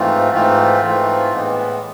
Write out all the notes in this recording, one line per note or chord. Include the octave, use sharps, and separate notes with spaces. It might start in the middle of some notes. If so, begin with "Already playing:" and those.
Already playing: G#2 E3 A3 C4 F4
G#2 E3 A3 C4 F4
G#2 E3 A3 C4 F4
A2 E3 G#3 B3